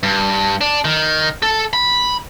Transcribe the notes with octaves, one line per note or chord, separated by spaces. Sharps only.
G2
D4
D#3
A4
B5